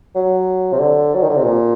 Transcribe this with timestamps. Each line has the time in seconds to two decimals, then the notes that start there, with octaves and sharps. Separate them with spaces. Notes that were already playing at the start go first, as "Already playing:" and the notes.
0.15 F#3
0.72 C3
0.80 D3
1.14 F#3
1.23 D#3
1.30 D3
1.37 C3
1.44 A#2